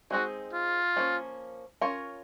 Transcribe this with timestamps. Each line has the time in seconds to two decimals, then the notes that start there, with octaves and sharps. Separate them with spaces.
0.11 G#3 C4 D#4 F#4 G#4
0.53 F4
0.96 F3 A#3 C#4
1.81 C#4 F4 A#4 C#5